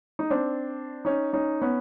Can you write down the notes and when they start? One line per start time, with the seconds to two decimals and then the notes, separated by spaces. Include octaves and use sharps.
0.19 D#4
0.30 C4 D4
1.05 C#4 D#4
1.33 C#4 D#4
1.61 B3 C#4